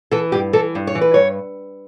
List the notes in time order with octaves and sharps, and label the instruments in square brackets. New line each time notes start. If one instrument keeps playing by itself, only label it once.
[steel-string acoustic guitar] E3 A4
G2 G4
E3 A4
G2
C#5
E3
B4
G2 C#5